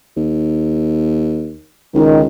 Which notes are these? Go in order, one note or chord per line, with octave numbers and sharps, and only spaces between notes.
D#2
C#2 D#3